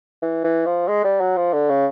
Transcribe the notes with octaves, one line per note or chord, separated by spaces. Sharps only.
E3
E3
F3
G#3
G3
F#3
F3
D3
C#3